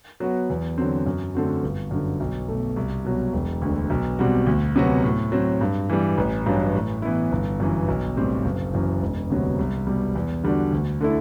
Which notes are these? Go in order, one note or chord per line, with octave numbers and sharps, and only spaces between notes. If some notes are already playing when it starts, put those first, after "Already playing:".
F#3 B3 F#4
E2
D3 F#3 C4
F#2
D3 A3 C4 F#4
G1
F#2 D3
B1
B2 A3
C2
B2 F#3
E1
D2 D3
B1
B2 G3 C4 F#4
D2
C3 F#3 B3 F#4
A2
F#3 C4
G2
E3 G3
A1
G2 F#3
A2
E3 B3 E4
G1
F#2 E3
B1
A2 G3 C4
F#1
F#2 E3
E1
D2 C3 F#3 B3
C2
B2 G3
E2
D3 G3 D4 F#4
D2
D3 A3 E4